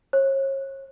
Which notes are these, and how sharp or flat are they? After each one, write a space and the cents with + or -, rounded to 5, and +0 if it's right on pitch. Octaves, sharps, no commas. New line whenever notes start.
C#5 -35